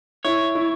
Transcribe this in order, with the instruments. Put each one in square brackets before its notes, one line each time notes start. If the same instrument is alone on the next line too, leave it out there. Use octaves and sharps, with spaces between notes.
[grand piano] E4 [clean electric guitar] C#5
[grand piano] E4